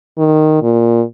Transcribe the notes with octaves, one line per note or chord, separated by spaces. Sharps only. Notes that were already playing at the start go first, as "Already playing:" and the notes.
D#3
A#2